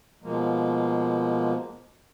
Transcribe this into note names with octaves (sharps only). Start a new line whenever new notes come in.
B2 F3 G#3 A#3